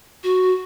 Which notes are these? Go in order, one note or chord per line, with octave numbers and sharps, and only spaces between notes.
F#4